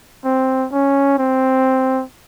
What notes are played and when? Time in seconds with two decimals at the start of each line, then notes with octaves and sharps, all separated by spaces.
0.24 C4
0.72 C#4
1.18 C4